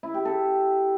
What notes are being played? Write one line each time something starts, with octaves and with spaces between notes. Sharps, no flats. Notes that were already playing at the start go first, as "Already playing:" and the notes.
E4
G4
A4